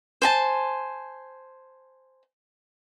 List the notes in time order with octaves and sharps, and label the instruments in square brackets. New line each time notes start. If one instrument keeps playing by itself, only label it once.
[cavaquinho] C5 G#5 A5